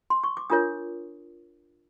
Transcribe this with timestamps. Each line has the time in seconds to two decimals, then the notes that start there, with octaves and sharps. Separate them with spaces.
0.10 C6
0.24 C#6
0.37 D6
0.50 D4 F4 A#4 C#5 D#6